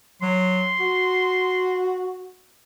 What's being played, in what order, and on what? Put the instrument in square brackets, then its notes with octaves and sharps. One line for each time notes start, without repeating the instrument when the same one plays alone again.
[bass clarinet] F#3 [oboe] C6
[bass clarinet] F#4